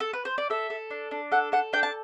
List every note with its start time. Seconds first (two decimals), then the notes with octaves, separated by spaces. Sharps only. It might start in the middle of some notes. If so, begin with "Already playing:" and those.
0.00 A4
0.13 B4
0.25 C5
0.38 D5
0.50 A4 E5
0.70 A4
0.90 D4
1.11 D4
1.31 A4 F#5
1.52 A4 F#5
1.73 D4 G5
1.83 A5